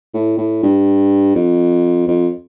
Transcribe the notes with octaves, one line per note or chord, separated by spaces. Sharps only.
A2
A2
G2
F2
F2